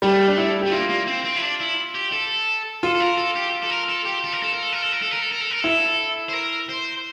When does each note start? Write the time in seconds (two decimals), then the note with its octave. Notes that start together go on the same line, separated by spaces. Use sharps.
0.02 G3 A3
0.28 D4
0.38 E4
0.61 G4
0.66 A3
0.72 A#3 F4
0.90 A#3
1.07 C4
1.24 C4
1.37 E4
1.42 D4
1.61 E4
1.95 G4
2.12 A4
2.83 F4 A4
2.95 A4
3.00 A#4
3.18 A4
3.36 G4
3.63 A4
3.70 A#4
3.89 A4
4.05 G4
4.24 A4
4.33 A#4
4.43 A4
4.53 A#4
4.62 A4
4.73 A#4
4.83 A4
4.92 A#4
5.02 A4
5.12 A#4
5.22 A4
5.32 A#4
5.42 A4
5.51 A#4
5.61 E4 A4
6.29 C5
6.34 A#4
6.69 C5